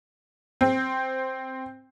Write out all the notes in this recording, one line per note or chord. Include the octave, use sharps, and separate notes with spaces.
C4